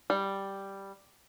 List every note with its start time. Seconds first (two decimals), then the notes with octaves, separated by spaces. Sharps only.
0.10 G3